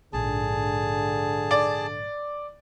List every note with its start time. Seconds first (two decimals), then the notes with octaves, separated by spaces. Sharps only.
0.13 A#1 G#2 D3 G#4 A5
1.51 D5